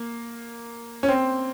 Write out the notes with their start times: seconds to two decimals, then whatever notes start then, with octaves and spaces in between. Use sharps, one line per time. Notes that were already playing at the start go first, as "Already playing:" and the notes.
Already playing: A#3
1.03 C#4
1.08 C4